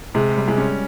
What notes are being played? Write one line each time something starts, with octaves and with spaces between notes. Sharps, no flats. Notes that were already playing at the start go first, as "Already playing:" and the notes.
C3 G#3
G3
G#3
C#4